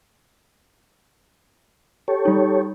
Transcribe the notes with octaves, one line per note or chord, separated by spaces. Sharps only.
G4 A4 C#5
G3 D#4